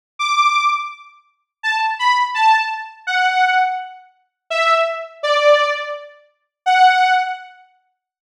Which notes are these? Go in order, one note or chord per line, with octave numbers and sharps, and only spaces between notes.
D6
A5
B5
A5
F#5
E5
D5
F#5